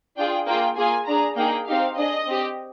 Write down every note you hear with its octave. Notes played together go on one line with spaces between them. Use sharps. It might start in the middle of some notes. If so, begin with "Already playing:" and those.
D4 F4 G#4 G5
A#3 F4 G#4 G5
A#3 F4 G#4 G#5
D4 G#4 A#5
A#3 D#4 G#4 G5
C4 D#4 G4 F5
D4 G#4 D#5
C4 G4